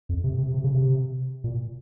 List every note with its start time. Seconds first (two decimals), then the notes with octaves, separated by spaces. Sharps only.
0.09 F2
0.24 C3
0.38 C3
0.54 C3
0.64 C#3
0.74 C3
1.44 A#2